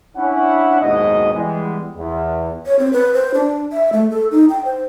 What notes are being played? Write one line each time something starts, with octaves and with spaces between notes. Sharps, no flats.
C#4 D4 E4 F#5
F#1 D#2 G#2 B2 D#5
E3 G3 G#3 B3
E2
C#5
C4
B4
C5
D4
E5
A3
A4
D#4
G5
C5